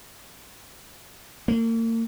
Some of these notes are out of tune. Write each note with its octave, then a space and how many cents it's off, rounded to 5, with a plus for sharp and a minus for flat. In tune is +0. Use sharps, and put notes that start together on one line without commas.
A#3 -40